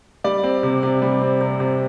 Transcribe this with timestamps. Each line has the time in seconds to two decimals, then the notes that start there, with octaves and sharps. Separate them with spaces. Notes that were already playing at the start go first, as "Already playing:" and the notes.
0.24 G3 D5
0.44 C4
0.63 C3
0.83 C3
1.02 G3
1.22 C4
1.41 C3
1.60 C3